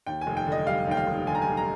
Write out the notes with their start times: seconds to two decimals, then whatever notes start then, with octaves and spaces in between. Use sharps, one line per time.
0.07 D#2 G5
0.21 G#5
0.27 F1
0.37 G5
0.46 D3
0.52 D#5
0.67 G3 F5
0.87 D#2 G5
0.97 F5
1.07 F1
1.27 D3 G#5
1.35 A#5
1.42 G#5
1.47 G3
1.57 A#5